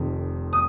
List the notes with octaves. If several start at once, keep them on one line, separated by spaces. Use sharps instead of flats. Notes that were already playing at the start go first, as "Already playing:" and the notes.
Already playing: F1 F2 D#3
D#6